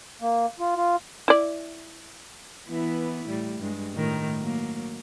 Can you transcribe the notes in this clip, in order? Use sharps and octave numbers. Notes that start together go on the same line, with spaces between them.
A#3
F4
F4
E4 D5
E3 B3 E4
A2 G3
G2 G#3
A2 D#3 A#4
F#3 A#3